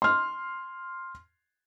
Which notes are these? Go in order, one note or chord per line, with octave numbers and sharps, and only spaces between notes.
C6 F6